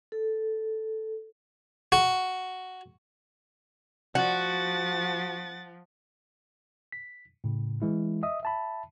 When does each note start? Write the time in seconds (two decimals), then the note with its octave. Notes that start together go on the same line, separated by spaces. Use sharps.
0.12 A4
1.92 F#4
4.15 F3 F#4 F#5 A6
6.92 B6
7.44 A2 C#3
7.82 E3 G#3 E4
8.23 D#5 E5 D#6
8.43 E5 A5 B5